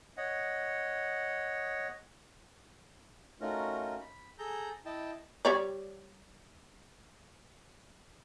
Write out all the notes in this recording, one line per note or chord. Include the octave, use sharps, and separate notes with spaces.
C#5 D#5 F#5
A3 C#4 D#4 F4 F#4 A#4
B5
G#4 A4 A#5 G6
E4 D#5 G5 A5
G3 C#5 D5